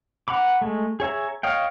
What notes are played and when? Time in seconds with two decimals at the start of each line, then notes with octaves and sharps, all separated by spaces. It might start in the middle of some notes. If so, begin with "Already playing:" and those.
0.28 F#5 A#5 B5 D6
0.61 G#3 A3
1.00 G#4 C#5 E5 A#5
1.43 C#5 D#5 F5 G5